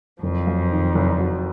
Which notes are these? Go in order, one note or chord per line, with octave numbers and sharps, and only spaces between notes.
F#1 F2 F3
F#2
D#3
F#1
F#3